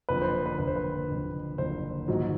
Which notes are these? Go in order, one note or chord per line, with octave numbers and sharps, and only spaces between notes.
F#1 F2 D3 B4
C5
C5
B4
F#1 F2 D3 B4
C5
B4
F#1 F2 D3
F#1 F2 D3 C5
A#1 G#2 D#3 F#3